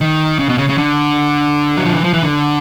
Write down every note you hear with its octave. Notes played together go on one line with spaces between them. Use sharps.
D#3
C#3
B2
C#3
C#3
D3
F#3
F3
E3
F3
E3
D3